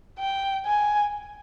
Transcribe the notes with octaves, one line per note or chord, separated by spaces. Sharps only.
G5
G#5